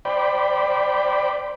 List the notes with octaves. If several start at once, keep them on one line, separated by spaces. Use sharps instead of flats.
C5 D5 G5 B5